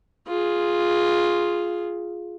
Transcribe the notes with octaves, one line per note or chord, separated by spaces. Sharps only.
F4 G#4